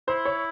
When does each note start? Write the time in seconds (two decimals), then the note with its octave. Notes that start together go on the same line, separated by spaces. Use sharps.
0.08 E4 C5
0.25 C#5